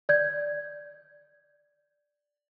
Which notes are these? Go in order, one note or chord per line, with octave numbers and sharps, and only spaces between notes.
D5 G6 G#6